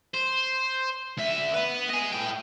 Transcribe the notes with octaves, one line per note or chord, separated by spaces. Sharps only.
C5
D2 E5
B3 B4
D#5 G#5
A2 G5